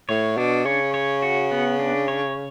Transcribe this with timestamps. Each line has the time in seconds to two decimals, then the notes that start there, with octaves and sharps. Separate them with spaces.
0.09 A2 C#5
0.37 B2 D4
0.65 C#3 C#5
0.94 C#5
1.22 F#4
1.52 B3
1.79 D4
2.08 C#5